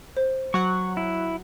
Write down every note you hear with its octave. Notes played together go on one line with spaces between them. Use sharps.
C5
F#3 F#5 C#6
E4